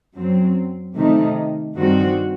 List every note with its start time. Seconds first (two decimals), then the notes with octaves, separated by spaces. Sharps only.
0.16 F#2 F#3 C4
0.95 C3 D#3 A3 D#4
1.75 G2 D#3 G3 C4 F#4